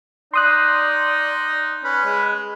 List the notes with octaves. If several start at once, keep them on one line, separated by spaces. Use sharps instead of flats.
D#4 D5 C6 D#6 F#6
C#4 B4
G#3